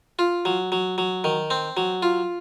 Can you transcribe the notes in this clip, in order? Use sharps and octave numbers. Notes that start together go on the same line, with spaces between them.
F4
F#3
F#3
F#3
D#3
C4
F#3
F4